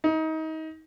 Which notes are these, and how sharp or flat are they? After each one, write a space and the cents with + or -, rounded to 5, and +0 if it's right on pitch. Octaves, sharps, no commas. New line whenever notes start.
D#4 +30